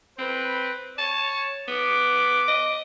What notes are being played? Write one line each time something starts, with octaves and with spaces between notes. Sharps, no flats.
C4 B4
C#5 A5
B3 D6
D#5